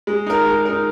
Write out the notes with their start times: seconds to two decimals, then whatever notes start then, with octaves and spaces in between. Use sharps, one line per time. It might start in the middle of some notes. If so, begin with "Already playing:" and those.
0.07 G#3
0.26 D#4 A#4
0.46 G#3
0.65 D#4 A#4